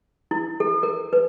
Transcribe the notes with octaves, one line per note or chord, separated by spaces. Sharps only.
E4
A4
A#4
B4